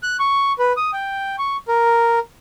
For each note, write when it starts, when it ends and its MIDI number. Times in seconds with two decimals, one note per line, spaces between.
0.03 0.17 90
0.19 0.52 85
0.59 0.73 71
0.77 0.91 87
0.93 1.36 79
1.38 1.57 85
1.68 2.19 70